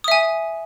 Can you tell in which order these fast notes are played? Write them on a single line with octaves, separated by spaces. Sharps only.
D#6 E5 G#5